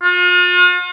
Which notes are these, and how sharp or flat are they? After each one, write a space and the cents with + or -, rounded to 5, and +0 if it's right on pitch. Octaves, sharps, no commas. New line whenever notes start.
F4 +45